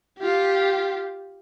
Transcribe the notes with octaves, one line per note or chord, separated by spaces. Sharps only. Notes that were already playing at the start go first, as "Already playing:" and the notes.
F4 G4